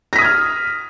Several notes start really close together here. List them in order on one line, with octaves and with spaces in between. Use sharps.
A#6 B6 D#6 G#6 F6